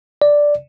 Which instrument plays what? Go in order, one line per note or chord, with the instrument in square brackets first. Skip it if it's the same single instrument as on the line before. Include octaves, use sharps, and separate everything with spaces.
[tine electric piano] D5